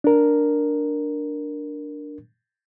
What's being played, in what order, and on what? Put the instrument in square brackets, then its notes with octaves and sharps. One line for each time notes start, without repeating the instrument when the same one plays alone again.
[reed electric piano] D4 A#4